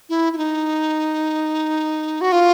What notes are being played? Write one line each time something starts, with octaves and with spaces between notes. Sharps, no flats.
E4
E4
D#4
F#4
F4